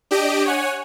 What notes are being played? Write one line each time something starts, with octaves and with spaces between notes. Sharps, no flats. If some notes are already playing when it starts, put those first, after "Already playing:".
D4 G4 D#5 D7
C#5 F#5 G#5